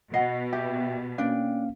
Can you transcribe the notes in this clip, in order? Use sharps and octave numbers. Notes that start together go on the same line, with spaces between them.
B2 D#5 F#5 C7
G4 E5 G5
A#3 C#4 D4 D5 F5 G5